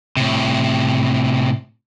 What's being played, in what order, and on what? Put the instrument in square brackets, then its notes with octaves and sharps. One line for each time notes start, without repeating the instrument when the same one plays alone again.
[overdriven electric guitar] A2 C3